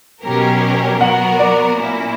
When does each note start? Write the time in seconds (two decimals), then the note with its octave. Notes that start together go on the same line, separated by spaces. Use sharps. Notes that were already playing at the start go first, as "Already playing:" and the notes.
0.23 B2 F#3 C#4 G4 A#4
1.00 F#3 B3 F#4 A#4 F#5
1.39 D5
1.77 A#2 A#3 C#4 E4